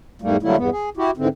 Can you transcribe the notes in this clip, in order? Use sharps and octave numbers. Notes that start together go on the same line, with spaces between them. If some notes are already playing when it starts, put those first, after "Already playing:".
E2 G#2 G3 A3 A#3
D3 F#3 G3 A3 A#3 E4
E2 G2 B3
G#4
E4 F#4 G4
G#2 D3 E3 C4